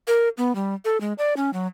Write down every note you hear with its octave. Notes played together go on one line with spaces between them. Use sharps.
A#4
B3
G3
A4
G#3
D5
C#4
F#3